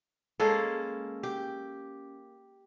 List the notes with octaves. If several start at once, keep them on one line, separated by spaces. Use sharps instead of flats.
G#3 A#3 C#4 A4
G4